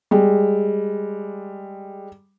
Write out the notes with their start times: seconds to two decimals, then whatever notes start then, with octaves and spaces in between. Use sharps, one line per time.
0.11 G3 G#3